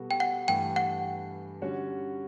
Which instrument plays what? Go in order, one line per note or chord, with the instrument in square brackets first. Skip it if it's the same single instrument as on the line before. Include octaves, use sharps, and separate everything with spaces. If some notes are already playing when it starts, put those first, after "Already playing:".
Already playing: [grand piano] B2 G3 B3 F#4 A4
[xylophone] G5
F#5
[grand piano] G2 E3 A3 [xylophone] G5
[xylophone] F#5
[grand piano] D3 G3 C#4 F#4 C#5